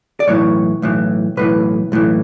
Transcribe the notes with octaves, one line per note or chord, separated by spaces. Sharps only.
D5
B1 A2 E3 C#5
B1 A2 E3
B1 A2 E3 B4
B1 A2 E3